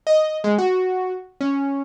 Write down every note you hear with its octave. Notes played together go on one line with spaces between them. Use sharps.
D#5
G#3
F#4
C#4